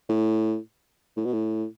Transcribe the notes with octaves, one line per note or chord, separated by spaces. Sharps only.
A2
A2
B2
A2